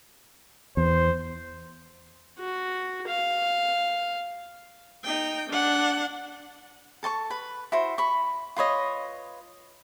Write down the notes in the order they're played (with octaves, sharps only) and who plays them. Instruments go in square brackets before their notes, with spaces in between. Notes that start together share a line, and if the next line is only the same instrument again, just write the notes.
[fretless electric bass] E2 [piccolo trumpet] C5
[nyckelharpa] F#4
F5
[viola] D#4 G5
D4 F#5
[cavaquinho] A4 A5 C6 C#6
B4 B5
E4 F#4 C5
B5 C#6
F4 B4 C#5 D#5